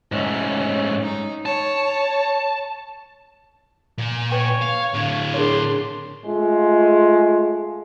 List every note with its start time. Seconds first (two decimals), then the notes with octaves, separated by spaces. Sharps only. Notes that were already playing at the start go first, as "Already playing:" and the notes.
0.12 G#2 A3 C#4
1.02 D#4
1.46 C#5 A5
3.98 A#2 G#5
4.31 B4 C#5 G5
4.62 F5
4.95 A2 D3 F5
5.34 D4 G#4 A#4 C#5 C6
6.25 G#3 A3 F4